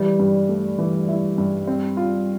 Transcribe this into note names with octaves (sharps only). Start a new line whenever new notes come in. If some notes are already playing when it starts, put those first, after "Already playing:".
Already playing: E3 G3
G2
A3
E3
E4
G2
C4
F4